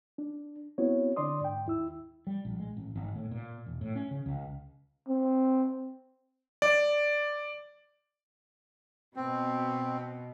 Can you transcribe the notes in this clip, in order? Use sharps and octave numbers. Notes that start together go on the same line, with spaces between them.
D4
B3 C4 E4 F#4 C#5
D3 D4 D5 C6 D#6
G#2 G5
D#2 E4 E6
G3
A#1
G#3
A1
G#1
A2
A#2
E1
A2
C#4
C#3
C#2
C4
D5
B2 C4